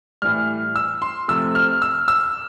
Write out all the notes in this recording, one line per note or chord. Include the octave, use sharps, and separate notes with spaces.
A2 E3 G3 F6
E6
C6
C3 F3 A3 E6
F6
E6
E6